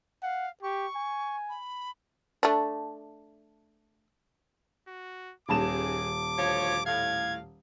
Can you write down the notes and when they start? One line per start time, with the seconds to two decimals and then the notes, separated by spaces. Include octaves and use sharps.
0.23 F5 F#5
0.63 G4 C#6
0.96 G#5
1.49 B5
2.43 A3 D4
4.88 F#4
5.49 D#1 D#2 G#4 A5 D6 E7
6.37 D2 F3 C#5
6.86 A2 F5 G#6